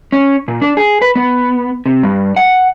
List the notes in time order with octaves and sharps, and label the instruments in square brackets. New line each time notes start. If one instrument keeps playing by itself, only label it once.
[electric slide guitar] C#4
A#2
D4
G#4
B4
B3
C3
G2
F#5